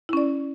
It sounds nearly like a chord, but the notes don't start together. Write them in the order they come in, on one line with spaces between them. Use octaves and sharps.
E4 C#4 D5